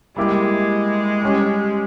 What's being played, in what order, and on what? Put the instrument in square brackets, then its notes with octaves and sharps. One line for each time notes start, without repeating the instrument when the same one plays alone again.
[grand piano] G3 A#3 E4 G4 [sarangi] G#3
[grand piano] G3 C#4 G4